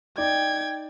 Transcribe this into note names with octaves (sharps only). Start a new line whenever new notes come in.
D#4 D5 G5 G#6